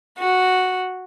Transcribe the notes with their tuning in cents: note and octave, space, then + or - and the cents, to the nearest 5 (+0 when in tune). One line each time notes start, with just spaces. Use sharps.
F#4 -5